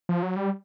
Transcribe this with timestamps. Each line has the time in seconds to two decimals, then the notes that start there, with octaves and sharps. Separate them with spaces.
0.09 F3
0.23 F#3
0.36 G3